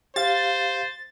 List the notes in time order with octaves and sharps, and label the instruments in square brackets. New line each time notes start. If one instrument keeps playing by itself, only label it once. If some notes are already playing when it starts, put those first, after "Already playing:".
[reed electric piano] G4 F5 [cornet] C5 [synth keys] A6